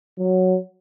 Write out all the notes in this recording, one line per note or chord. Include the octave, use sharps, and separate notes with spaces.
F#3